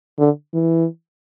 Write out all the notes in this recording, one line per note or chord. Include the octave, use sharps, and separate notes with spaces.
D3
E3